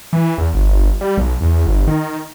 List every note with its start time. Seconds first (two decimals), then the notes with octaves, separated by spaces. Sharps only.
0.13 E3
0.38 E2
0.54 G1
1.01 G3
1.18 B1
1.41 E2
1.66 G1
1.87 D#3